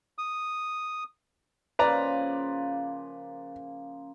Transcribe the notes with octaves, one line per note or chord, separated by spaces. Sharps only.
D#6
C#3 F3 A#3 B4 D5 A#5